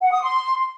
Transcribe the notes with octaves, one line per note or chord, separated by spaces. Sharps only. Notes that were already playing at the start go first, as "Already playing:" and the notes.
F#5
D#6
C6